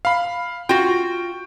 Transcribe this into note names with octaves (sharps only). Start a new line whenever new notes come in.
F5 B5
F4 F#4 G5